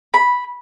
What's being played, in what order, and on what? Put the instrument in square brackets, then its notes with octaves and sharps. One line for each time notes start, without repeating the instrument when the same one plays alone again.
[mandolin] B5